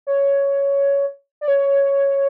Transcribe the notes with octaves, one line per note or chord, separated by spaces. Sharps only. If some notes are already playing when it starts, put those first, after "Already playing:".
C#5
D5
C#5